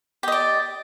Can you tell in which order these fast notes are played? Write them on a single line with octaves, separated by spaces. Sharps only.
G4 D#5 D5